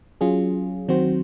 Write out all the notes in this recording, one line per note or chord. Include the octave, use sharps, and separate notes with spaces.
F#3 C#4 F4 G#4
D#3 F#3 C4 F#4 C5